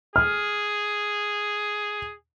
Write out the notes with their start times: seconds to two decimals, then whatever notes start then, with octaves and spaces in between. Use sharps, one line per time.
0.16 G#4 F6